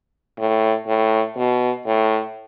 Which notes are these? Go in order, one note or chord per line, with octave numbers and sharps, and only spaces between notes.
A2
A2
B2
A2